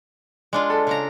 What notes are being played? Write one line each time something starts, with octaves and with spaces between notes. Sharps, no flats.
G#3 D4 F4
A4
C#3 D4 A#5